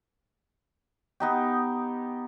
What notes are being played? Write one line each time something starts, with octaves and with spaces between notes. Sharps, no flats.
B3 D#4 G4